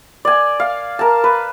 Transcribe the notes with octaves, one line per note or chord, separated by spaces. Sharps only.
D5 G#5
F5
A#4 A5
B4